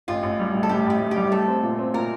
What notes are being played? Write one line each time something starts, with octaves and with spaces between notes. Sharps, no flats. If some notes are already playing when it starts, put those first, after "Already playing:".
A1 F4
A1
G3
A2
A4
A2 G4
A1 G4
A2
G3 G4
A3 A4
C4
A#2
C4
A#2 A#4